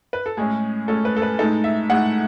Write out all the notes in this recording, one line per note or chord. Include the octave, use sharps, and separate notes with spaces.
B4
A4
A2 G#3 C#4 G#4
A2 G#3 C#4 A4
B4
A4
B4
A2 G#3 D#4 A4
E5
A2 G#3 D#4 F#5